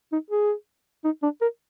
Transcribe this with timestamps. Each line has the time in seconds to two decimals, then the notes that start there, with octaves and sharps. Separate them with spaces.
0.12 D#4
0.31 G#4
1.04 D#4
1.23 D4
1.42 A#4